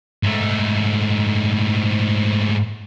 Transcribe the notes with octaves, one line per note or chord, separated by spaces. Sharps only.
G#2 A3